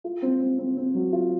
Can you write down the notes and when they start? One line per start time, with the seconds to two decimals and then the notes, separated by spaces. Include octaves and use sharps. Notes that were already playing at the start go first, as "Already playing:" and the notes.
0.04 F4
0.22 C4
0.40 C4
0.58 C4
0.77 C4
0.94 F#3
1.13 F4